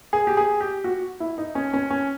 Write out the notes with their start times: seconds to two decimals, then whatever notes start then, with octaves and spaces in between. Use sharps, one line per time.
0.13 G#4
0.27 G4
0.37 G#4
0.61 G4
0.84 F#4
1.20 E4
1.38 D#4
1.55 C#4
1.73 C#4
1.90 C#4